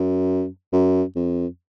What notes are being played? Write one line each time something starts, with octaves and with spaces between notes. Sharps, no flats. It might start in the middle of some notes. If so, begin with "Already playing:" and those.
Already playing: F#2
F#2
F2